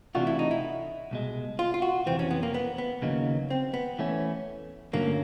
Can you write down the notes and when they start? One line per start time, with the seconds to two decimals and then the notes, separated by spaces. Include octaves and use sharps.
0.15 C3 E3 A3 D4 F4 F#4
0.27 E4
0.39 D#4
0.51 E4
1.11 C2 B2 G#3
1.59 F4
1.74 F4
1.82 F#4
2.06 F2 C3 E3 C4
2.19 C#4
2.31 B3
2.43 A#3
2.54 B3
2.78 B3
3.02 D#2 C#3 F#3 A#3 D#4
3.50 C4
3.74 B3
3.99 E3 A3 C#4
4.93 G2 D3 F#3 A3 A#3 C#4